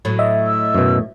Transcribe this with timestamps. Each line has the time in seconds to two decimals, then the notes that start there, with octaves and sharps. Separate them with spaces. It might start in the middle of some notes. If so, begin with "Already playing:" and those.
0.05 A2 F#3
0.19 D#5 E5
0.46 E6
0.75 F#2 B2